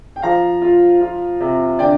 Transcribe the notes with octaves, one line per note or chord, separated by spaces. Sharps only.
G5
F3 F5 A#5
F4
F4
C3
D3 D5 G5